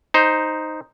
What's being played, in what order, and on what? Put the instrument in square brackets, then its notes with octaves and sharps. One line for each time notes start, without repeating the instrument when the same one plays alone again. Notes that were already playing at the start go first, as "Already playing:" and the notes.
[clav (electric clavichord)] D#4 C5